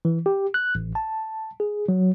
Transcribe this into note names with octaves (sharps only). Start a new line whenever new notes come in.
E3
G4
F#6
A1
A5
G#4
F#3